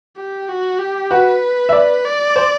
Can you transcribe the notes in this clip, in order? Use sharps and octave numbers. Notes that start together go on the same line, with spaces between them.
G4
F#4
G4
F#4 B4
E5
D5
D5
C5